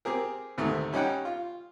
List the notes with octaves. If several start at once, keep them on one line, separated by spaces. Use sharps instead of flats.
C4 G4 G#4 A#4
D2 G#2 C3 D#3 A3
G3 C#4 D#4 F#5 G5
F4